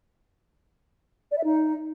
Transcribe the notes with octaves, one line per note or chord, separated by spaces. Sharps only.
D5
E5
D#4